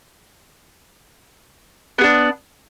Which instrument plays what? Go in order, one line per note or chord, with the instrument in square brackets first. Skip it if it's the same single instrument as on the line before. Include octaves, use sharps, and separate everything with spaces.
[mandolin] B3
G#4
D4